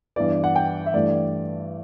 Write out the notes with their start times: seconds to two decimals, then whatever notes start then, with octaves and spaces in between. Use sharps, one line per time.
0.16 G2 E3 B3 D5
0.44 F#5
0.55 G5
0.86 E5
0.94 G2 E3 A3 D5